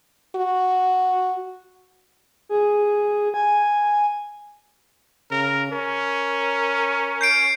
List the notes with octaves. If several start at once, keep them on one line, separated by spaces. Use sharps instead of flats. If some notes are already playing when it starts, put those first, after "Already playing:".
F#4
G#4
G#5
C#3 A#4
C#4 A#4
G6 C7 D7